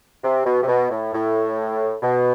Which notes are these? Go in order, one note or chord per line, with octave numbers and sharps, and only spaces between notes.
C3
B2
C3
B2
A2
A2
B2